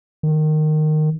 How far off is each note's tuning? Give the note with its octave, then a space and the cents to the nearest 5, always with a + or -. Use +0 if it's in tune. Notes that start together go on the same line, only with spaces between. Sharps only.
D#3 -15